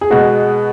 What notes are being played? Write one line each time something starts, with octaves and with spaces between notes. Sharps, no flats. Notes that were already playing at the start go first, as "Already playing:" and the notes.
G#4
B2 G#3 F#4